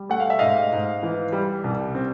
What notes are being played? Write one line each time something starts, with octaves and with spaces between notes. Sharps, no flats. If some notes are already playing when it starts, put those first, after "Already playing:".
Already playing: G3
A3 F#5
F5
E5
G#2 D#5 F5
G#2
E3
G3
C2
C4